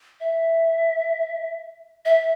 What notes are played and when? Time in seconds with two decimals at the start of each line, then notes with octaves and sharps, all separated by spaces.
0.20 E5
2.05 E5